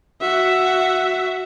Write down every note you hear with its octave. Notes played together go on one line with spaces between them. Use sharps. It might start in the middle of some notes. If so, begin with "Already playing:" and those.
F#4 E5